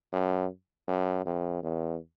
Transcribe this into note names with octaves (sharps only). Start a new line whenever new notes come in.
F#2
F#2
F2
E2